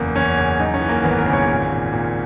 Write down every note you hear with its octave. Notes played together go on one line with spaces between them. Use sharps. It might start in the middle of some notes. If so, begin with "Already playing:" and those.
Already playing: F#1 E2 A#3
E2 C#4
C#3
F#2 D#4
C#4
E3
A#3
G#1 B3
A#4
C#3
C#5
A#2
A#2
A#2